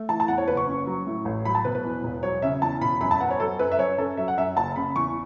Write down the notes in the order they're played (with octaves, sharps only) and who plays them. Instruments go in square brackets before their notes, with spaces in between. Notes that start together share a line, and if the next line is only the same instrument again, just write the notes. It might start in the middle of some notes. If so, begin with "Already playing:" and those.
Already playing: [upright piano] A3
E3 A5
A5
E2 F#5
C#5
F#1 B4
C#6
C#4
F#3
A2
A1
F#3 B5
A5
B2 B4
B4
E2
E1
F#3 C#5
C#3 E5
E2 A5
E1 B5
F#2 B5
A5
B3 F#5
C#5
F#3 A4
F#2 B4
E5
F#2 C#5
C#4 A4
F#3 E5
F#5
F#2 E5
F#1 A5
C#3 B5
E2 C#6